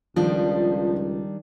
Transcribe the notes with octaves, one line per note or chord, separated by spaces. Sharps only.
C#2 D#3 F3 G3 D4